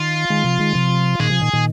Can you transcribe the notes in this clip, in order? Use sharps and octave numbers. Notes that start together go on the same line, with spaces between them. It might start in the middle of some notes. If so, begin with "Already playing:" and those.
Already playing: D#3 F4
D#3 G#3
C3 F3
D#3 G#3
C3 F3
A#2 D#3 G#4
C3 F3
A#2 D#3
A#2 D#3